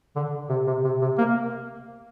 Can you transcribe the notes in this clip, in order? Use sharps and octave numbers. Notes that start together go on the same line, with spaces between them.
D3
C3
C3
C3
C3
A#3